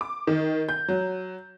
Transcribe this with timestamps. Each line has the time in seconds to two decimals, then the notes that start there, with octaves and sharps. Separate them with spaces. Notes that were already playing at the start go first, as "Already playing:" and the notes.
0.01 D6
0.27 D#3
0.69 G6
0.88 F#3